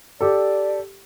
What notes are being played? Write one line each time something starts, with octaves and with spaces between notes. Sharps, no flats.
G4 A4 D5